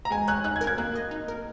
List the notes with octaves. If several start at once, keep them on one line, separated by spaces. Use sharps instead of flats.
A#5
G#3 G#5
C#5 F#6
D#4 F#6
G#6
A#4
G#6
A#3 F#6
D#5
D#4
A#4